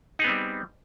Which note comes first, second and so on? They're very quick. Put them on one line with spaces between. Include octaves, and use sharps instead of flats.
D#4 G#4 B3 C4 G3